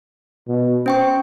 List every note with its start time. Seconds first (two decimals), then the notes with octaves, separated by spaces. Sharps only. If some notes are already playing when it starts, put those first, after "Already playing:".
0.48 B2
0.86 C#4 C5 G5 C#6